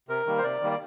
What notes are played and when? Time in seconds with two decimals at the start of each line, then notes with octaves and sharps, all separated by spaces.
0.09 C3 A#4
0.26 D#3 G3 A#3
0.38 C5
0.43 C3 D5
0.61 D#3 G3 A#3
0.71 D5